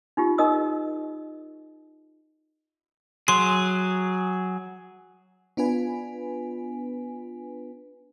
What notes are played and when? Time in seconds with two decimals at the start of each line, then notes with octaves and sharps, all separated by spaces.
0.17 D#4 F4 G4
0.38 D#4 A#4 D#5 D#6 E6
3.28 F#3 G#4 C6
5.57 B3 D4 F4 B4 G#5